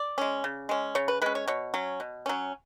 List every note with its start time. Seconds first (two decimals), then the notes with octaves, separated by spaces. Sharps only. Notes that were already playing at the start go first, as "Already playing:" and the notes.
Already playing: D5
0.18 G#3 C#4
0.44 C#3
0.69 G#3 C#4
0.95 C#3 C#5
1.08 B4
1.22 G#3 C#4 B4
1.35 C#5
1.48 B2 C#5
1.74 F#3 C#4
2.00 B2
2.26 F#3 C#4